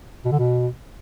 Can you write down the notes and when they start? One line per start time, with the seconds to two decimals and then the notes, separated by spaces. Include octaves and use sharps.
0.25 B2
0.32 D3
0.39 B2